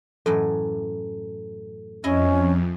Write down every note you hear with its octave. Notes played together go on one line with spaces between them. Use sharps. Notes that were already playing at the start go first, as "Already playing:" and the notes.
F#2 A2 E3 A4
F2 C#4 E4 G#4 D#5